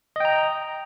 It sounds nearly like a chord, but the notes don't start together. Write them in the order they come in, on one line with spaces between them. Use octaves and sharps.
D#5 G5 A#5